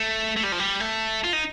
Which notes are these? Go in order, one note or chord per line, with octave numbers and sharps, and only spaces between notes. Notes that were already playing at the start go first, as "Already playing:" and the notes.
Already playing: A3
A3
G3
F3
G3
A3
F4
D#4